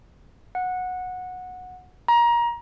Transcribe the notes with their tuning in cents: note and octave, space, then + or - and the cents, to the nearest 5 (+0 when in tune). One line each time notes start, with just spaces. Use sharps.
F#5 -15
A#5 +25